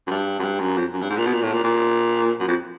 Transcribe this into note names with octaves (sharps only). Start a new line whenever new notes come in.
F#2
G2
F#2
G2
F#2
F2
F#2
G2
G#2
A#2
B2
A#2
A2
A#2
A#2
F#2
F2